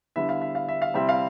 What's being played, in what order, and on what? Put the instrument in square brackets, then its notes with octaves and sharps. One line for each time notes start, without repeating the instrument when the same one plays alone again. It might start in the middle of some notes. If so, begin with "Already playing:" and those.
[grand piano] D3 G3 B3 E4 E5
F5
E5
F5
E5
F5
C3 G3 C4 E4 E5
F5